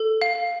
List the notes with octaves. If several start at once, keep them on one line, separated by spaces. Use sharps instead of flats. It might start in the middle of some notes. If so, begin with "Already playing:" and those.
Already playing: A4
F5